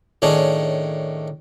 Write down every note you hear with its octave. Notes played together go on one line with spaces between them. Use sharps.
A2 D#3 C#4 D4 G#4